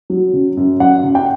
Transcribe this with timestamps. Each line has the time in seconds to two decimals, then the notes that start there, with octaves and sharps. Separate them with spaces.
0.10 F#3
0.33 C#3
0.57 F#2
0.80 F#2 F#5
1.03 C#3
1.15 G5